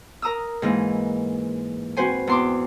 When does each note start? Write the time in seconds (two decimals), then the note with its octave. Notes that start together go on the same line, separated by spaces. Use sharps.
0.22 A#4 A#5 D#6 E6
0.62 G#2 E3 A#3
1.97 C4 F#4 B4 C5 G#5
2.27 E2 C6 D6